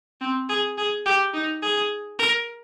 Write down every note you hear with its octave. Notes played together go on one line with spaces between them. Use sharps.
C4
G#4
G#4
G4
D#4
G#4
A#4